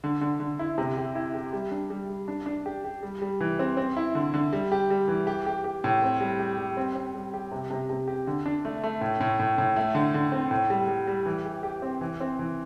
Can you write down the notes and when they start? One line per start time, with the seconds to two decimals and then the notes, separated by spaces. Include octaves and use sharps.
0.04 D3
0.21 D3
0.40 D3
0.59 E4
0.78 C3
0.97 G4
1.15 E4
1.34 G4
1.53 G3
1.71 D4
1.90 G3
2.10 G3
2.28 D4
2.46 D4
2.66 G4
2.84 G4
3.03 G3
3.22 G3
3.40 E3
3.59 C4
3.77 C4
3.97 E4
4.15 D3
4.34 D3
4.53 G3
4.72 G4
4.90 G3
5.08 E3
5.27 G4
5.46 G4
5.64 G4
5.84 A2
6.02 C4
6.21 G3
6.40 G4
6.58 G3
6.77 C4
6.96 C4
7.15 G3
7.34 G4
7.52 C3
7.70 C3
7.90 C3
8.08 G4
8.27 D3
8.46 D4
8.65 A3
8.83 A3
9.01 A2
9.20 A2
9.39 A2
9.58 A2
9.76 A3
9.95 D3
10.14 D3
10.32 C4
10.51 A2
10.70 G3
10.88 G3
11.07 G3
11.26 E3
11.45 G4
11.63 G4
11.82 C4
12.01 E3
12.20 C4
12.39 E3